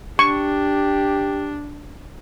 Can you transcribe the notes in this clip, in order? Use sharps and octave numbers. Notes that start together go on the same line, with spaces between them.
D4 G4 C#6